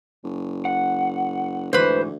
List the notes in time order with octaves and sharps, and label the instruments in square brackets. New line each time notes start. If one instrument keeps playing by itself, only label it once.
[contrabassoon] F#1
[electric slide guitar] F#5
[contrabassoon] D2 [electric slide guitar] G#2 E3 [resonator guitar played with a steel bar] B4 C5